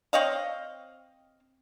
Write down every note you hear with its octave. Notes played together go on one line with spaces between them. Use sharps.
C4 C#5 D#5 F5